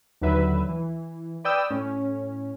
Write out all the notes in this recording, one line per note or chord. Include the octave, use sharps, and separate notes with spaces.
D#2 D3 F#3 B4 E5
E3
B4 D5 G5 D#6 E6
A2 C#4